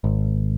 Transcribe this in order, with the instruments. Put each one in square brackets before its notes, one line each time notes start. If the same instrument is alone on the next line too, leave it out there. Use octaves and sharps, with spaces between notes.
[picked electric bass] G#1